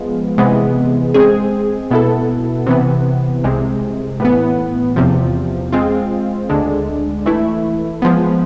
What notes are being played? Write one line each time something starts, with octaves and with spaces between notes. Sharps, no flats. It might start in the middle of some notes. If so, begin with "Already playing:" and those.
Already playing: F3 G#3 B3 F4
C3 E3 G#3 B3
G#3 C4 G#4
B2 B3 E4 A4
C3 E3 B3
C2 C3 G#3
A2 E3 B3
E2 C3 F3
G#3 C4 F4
D2 D3 G#3 D4
E3 A3 E4
F3 G#3 B3